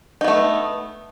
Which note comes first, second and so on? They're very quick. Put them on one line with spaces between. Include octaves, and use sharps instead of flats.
D#4 B3 A3